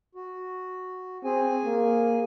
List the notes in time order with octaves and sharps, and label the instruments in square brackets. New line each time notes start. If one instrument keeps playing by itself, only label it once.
[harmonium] F#4
[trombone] C4 [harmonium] G#4 G#5
[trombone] A#3